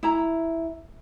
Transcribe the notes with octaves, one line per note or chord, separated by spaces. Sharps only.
E4 A#5